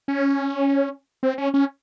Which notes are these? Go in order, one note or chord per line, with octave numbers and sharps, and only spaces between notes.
C#4
C4
C#4
C#4